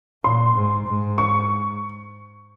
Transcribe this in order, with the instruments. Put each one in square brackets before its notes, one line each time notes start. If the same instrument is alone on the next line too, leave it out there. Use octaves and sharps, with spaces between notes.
[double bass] A#2 [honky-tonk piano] C6
[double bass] G#2
G#2
[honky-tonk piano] C#6